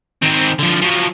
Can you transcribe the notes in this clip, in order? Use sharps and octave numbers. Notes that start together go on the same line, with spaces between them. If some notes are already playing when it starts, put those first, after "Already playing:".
D#3 C4
D3 F3
F3 F#3